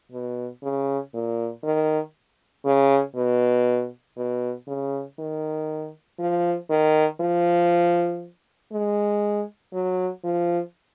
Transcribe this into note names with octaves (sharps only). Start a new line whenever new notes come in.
B2
C#3
A#2
D#3
C#3
B2
B2
C#3
D#3
F3
D#3
F3
G#3
F#3
F3